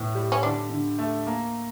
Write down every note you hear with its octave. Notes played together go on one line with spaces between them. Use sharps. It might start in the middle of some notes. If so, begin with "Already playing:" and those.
Already playing: A2 B3
G3
C#4
D3 D4
D3
A3
A#3